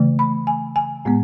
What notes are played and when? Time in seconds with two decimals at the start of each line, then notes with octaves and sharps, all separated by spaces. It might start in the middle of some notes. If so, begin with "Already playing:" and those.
Already playing: C#3 E3 A3
0.19 B5
0.47 G#5
0.76 G#5
1.05 A2 G#3 B3